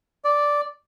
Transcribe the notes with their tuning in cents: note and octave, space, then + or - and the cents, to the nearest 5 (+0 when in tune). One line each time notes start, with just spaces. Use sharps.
D5 -5